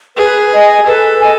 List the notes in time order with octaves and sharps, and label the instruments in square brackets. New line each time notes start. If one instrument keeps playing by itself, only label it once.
[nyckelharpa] G#4 [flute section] B4
[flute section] D#5 G#5
[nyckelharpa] A4 [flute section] B4
[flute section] D#5 G#5